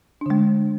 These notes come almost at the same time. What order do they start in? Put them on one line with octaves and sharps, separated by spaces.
D4 D3 G#3